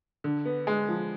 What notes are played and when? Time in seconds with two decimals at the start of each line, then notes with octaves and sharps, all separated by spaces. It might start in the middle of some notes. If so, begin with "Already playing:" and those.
0.24 D3
0.45 B3
0.67 G#3
0.89 F3